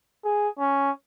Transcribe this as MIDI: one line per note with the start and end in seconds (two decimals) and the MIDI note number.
0.24 0.48 68
0.59 0.90 61